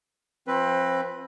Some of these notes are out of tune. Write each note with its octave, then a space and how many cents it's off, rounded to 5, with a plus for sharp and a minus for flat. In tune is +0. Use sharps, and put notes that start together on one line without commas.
F3 +0 C4 +20 B4 +0